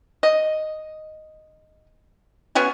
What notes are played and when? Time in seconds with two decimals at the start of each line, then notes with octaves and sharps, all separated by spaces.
0.23 D#5
2.55 B3 C#4 F#4 G#4